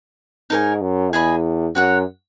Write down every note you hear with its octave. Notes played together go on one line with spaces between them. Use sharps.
G#2 D#4 A#4 C#5 G#5
F#2
E2 G#4 D#5 G#5 B5
F#2 F#4 C#5 F#5